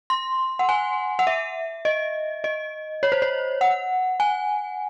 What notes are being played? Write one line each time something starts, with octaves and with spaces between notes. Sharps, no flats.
C6
F#5
G#5
F#5
E5
D#5
D#5
C#5
C5
C#5
F#5
G#5